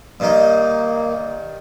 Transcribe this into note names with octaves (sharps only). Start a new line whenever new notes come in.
G2 D#3 A#3 D#4